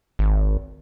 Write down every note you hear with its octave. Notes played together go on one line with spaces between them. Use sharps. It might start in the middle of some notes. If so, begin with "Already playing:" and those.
G#1